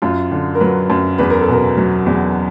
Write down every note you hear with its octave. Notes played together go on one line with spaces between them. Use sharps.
F#2 F4
D3
A#4
F#3 B4
F#2
E2 B4
A#4
A4
B2 A#4
F#3
E2